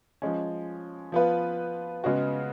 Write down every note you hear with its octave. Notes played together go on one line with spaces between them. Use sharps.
F3 G#3 C#4
F3 B3 F4 B4
C#3 G#3 B3 F#4